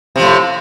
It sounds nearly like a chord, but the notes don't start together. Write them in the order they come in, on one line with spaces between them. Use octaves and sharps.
C3 F3 A2